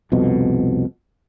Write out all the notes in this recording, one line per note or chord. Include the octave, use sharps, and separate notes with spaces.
C2 F2 B2